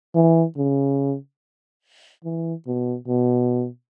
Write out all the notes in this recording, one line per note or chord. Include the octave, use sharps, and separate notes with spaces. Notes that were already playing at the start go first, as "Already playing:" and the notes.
E3
C#3
E3
B2
B2